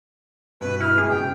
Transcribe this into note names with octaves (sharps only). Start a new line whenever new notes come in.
G2 B2 B4
E4 F6
B2 G#3 G#4
F#1 F#3 G5